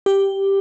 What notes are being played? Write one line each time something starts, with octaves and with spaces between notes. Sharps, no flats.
G4